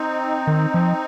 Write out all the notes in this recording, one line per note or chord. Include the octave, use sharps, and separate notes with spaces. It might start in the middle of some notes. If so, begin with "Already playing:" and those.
Already playing: C4 D#4
D#3
F3